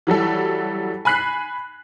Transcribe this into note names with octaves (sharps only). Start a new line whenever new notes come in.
E3 F#3 G3 A4
G#5 B5 F#6 B6 C7